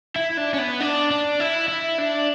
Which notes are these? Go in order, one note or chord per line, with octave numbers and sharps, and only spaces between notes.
E4
D4
C#4
B3
D4
D4
E4
E4
D4